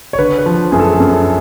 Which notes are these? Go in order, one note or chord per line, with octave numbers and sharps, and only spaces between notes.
C#5
D3 B4
B4
F3
F#2 G#4
A4
F#2